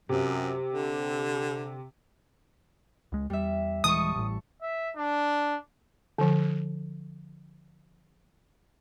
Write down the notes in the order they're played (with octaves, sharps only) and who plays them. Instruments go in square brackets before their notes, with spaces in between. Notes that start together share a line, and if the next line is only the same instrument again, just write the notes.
[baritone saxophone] F#2 [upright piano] C3
[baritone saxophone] D3
[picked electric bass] C#2 G#3
[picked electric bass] E2 [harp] G3 E5
[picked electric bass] D#1 E3 G#3 [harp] A5 C#6 [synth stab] D#6
[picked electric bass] A1 A2
[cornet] E5
D4
[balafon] D3 F3